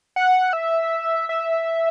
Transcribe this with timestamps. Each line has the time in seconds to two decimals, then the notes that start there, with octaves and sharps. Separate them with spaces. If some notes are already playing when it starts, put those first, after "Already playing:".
0.16 F#5
0.53 E5
1.29 E5